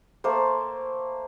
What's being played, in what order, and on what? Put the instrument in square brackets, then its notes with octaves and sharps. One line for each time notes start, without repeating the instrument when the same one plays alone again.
[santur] A3 A#3 C5